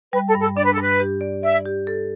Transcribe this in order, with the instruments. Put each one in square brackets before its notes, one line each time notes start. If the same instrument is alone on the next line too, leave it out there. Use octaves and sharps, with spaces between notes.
[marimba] G3 [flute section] B4
[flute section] A4
[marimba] G2
[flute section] A4
[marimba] D4 [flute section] D5
[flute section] B4
A4
[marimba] G2 [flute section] B4
[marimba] G4
D5
[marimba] D5 [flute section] E5
[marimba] G4
A4